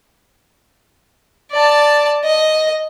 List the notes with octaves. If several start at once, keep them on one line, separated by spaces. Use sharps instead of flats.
D5 A5
D#5